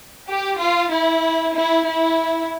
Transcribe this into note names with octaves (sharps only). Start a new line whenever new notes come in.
G4
F4
E4
E4
E4